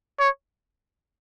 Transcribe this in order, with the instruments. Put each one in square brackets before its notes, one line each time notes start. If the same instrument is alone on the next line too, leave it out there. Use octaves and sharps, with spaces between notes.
[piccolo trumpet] C#5